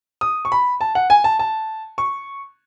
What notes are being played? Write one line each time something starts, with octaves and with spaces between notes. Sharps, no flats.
D#6
C#6
B5
A5
F#5
G#5
A5
A5
C#6